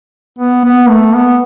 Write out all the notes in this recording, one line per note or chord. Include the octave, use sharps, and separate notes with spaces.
B3
B3
A3
B3